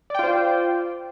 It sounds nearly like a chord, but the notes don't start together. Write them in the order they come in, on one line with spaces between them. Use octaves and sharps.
D5 G5 F4 C5